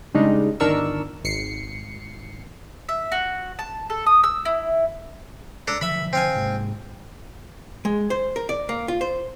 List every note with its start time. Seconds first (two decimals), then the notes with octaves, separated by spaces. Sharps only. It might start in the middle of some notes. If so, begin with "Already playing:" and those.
0.14 C#3 G3 G#3 D4 D#4
0.60 G1 D#3 D4 A#4 C#6 E6
1.24 G#1 C7 C#7
2.89 E5
3.12 F#4
3.59 A5
3.90 A4
4.06 D#6
4.24 E6
4.45 E4
5.68 D4 A4 A#5
5.81 D3 D#3 F3 E5 B5
6.13 C4 F5 G#5
6.36 G#2 C3 G#3
7.85 G#3
8.10 C5
8.36 A#4
8.49 D5
8.69 A#3
8.88 F4
9.01 C5